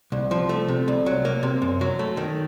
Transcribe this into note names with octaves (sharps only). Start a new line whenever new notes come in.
C2
F3
A3
C3
C2
F#3
A#3
C3
F#2
F#3
A3
D#3